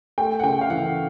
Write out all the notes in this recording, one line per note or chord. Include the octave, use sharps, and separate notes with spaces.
A3 G5
F#5
C#3 G5
F5
E3 F#5